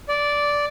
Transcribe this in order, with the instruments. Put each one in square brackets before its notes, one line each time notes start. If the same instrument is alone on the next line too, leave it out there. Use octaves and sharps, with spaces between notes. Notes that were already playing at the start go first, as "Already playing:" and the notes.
[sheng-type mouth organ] D5